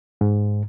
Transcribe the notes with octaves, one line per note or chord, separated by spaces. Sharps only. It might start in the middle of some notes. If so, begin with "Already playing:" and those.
G#2